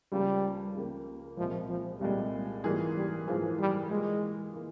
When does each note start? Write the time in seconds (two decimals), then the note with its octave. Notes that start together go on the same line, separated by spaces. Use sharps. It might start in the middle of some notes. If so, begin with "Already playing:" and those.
0.12 C#2 C#3 F3 G3 A#3
0.75 C#2 C#3 F3 A#3
1.37 C2 A#2 F3 G#3
1.69 F3
2.01 C2 A#2 G3 G#3
2.64 G#2 E3 G3 A#3 F4 G#4
2.96 G3
3.27 G#2 E3 F3 A#3 F4 G#4
3.59 G3
3.90 E3 G#3 A#3 F4
4.54 E3 A#3